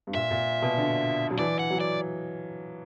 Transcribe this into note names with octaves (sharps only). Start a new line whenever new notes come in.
G2
A#2 E5
A#2
B2
D3
F#3
E3 D5
F#5
F#3
D5